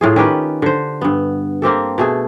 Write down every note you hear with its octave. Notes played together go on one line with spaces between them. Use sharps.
A2 F4 G#4
D#3 C#4 G4 B4
D3 C5
G2 B3
A#3 C4 G4 A4
B2 A3 G#4